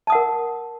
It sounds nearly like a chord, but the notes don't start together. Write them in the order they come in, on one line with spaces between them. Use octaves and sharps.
A5 D#6 F#5 A#4